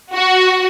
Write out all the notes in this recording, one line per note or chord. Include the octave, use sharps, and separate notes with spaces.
F#4